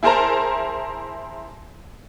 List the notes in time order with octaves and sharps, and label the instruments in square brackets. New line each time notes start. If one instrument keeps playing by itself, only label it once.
[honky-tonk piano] E4 G#4 A#4 C5 A5 A#5